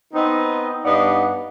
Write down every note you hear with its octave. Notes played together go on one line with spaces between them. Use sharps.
B3 C4 D#4
G2 B3 D#4 D5 F#5